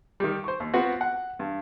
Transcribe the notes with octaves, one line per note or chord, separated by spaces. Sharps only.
D#3 G3
C5 C#6
D#2
B3 C4 F4 F#4
F#5
G2